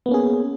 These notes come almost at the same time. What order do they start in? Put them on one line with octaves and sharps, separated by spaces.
B3 A#3 C#4 G#4